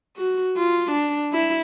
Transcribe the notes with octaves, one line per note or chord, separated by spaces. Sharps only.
F#4
F4
D4
E4